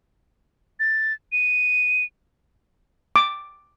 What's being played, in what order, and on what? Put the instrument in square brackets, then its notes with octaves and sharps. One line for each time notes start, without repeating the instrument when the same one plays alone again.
[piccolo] A6
D#7
[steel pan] D6